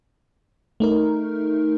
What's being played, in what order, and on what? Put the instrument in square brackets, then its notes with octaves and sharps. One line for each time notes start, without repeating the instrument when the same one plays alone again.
[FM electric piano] A3 D#4 A#4